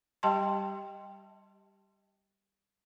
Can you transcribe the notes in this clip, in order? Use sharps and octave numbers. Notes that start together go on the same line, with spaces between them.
G3 G4 D#5 G5 A5 C6